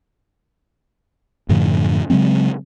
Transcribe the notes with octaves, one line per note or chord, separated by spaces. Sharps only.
F#2 A2 D3 F3
C#3 F#3 G#3 C4